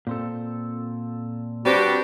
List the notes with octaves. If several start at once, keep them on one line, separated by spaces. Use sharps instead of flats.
A#2 C4 A4
G3 C4 D4 F#4 G4 B4 C5